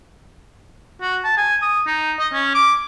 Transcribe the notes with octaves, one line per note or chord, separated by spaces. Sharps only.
F#4
A5
G#5
D#6
D#4
D#5
C#4
D6